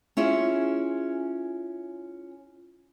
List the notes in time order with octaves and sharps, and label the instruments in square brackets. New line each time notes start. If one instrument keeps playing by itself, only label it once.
[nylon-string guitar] C#4 E4 F4 G#4